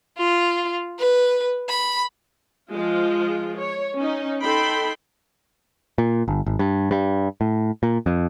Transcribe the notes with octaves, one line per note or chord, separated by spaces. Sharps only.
F4
B4
B5
F3 G#3 F4
C#5
C#4 D#4
D#4 A4 G5 B5 C6
A#2
G1
G#1
G2
G2
A2
A#2
F2